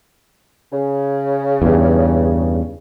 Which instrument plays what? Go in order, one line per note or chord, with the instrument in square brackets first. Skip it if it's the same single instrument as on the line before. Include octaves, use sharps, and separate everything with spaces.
[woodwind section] C#3
[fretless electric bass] E2 G2